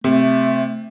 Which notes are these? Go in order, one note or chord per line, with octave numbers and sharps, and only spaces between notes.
C3 A3